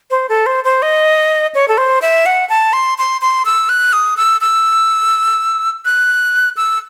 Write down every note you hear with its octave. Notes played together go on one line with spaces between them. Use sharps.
C5
A4
C5
C5
D#5
C#5
A4
C5
E5
F#5
A5
C6
C6
C6
E6
F#6
D#6
E6
E6
F#6
E6